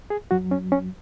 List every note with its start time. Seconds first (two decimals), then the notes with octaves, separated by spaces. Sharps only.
0.10 G#4
0.31 F#2 F#3 F#4
0.51 C#4
0.72 C#4